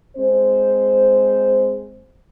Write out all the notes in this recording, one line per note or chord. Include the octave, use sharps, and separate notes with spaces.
G#3 C4 C5